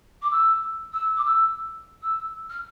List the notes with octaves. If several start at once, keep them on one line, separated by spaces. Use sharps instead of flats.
D6
E6
E6
D6
E6
E6
F6